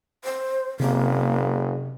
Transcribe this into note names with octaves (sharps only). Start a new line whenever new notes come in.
C5
F#1 C3 A#3